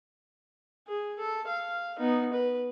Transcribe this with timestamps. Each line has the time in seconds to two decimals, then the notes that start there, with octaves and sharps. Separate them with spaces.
0.88 G#4
1.19 A4
1.48 F5
1.99 B3 D#4
2.33 B4